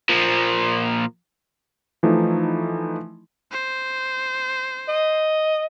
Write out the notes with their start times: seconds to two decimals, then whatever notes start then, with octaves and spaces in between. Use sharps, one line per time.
0.09 A#2 F3
2.03 E3 F3 A3 D#4 E4
3.52 C5
4.88 D#5